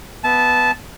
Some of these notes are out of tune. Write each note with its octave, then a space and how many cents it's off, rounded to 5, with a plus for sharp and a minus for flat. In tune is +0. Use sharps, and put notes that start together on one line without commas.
B3 +5 E5 +0 A5 -15